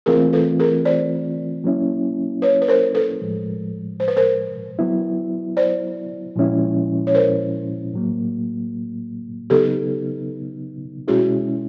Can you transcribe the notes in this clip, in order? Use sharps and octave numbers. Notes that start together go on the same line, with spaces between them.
E3 A3 C4 F4 G#4 A#4
A4 B4
G#4 A#4
C5 D5
F#3 A#3 C#4 E4
B4 C#5
B4
A#4 C5
A4 B4
A2 F3 G#3
C5
B4
A#4 C5
F#3 B3 E4
C5 D5
A#2 F3 G#3 C#4 E4
C#5
A#4 C5
A2 F#3 A#3
C#3 F#3 B3 D#4 G4 A4
B2 G#3 C#4 E4 F#4 G#4